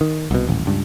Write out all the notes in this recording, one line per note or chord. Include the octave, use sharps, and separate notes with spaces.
D#3
C2 B2
D#1 A1
C#2 G2